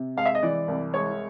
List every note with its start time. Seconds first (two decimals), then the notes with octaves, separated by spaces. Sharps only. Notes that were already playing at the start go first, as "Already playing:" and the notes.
Already playing: C3
0.17 G#3 F5
0.26 E5
0.35 D#5
0.42 E3 D5
0.68 C2
0.94 G#3 C#5